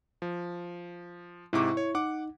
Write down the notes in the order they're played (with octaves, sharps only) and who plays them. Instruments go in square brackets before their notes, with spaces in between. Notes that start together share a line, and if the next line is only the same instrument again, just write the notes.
[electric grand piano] F3
[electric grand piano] G#2 C3 D6 [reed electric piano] E4 C#6
[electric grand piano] C#5
[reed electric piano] D#4 [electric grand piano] F#5 D6